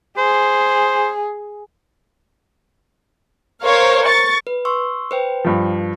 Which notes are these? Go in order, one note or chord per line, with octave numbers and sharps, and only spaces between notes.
G#4 C5
A#4 C5 C#5 F5
C#6 A6
B4
C6 C#6 E6
B4 C5 G5
G2 F3